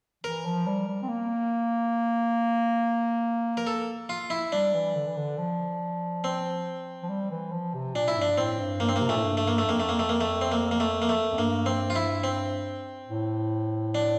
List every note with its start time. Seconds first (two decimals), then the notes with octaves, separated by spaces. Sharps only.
0.24 E3 A#4
0.45 F3
0.66 G3
0.88 G3
1.03 C4
1.09 A#3
3.57 A#4
3.67 A4
4.09 F4
4.30 E4
4.52 G3 D4
4.74 E3
4.95 D3
5.07 E3
5.17 D3
5.38 F3
6.24 C4
7.02 F3
7.09 G3
7.31 E3
7.52 F3
7.74 C3
7.95 A#2 D4
8.08 E4
8.16 G2
8.22 D4
8.38 A2 C4
8.60 G2
8.80 G2 A#3
8.89 C4
8.96 C3 A#3
9.09 A#2 A3
9.16 A2
9.24 G2
9.37 A3
9.48 A#3
9.58 A3
9.67 F2 A#3
9.80 A3
9.89 A#3
9.99 A3
10.09 A#3
10.21 A3
10.41 C4
10.52 A#3
10.71 A#3
10.80 A3
11.02 A#3
11.09 A3
11.32 F2
11.38 G2 A#3
11.66 C4
11.90 F4
11.96 E4
12.24 C4
13.09 A2
13.95 D4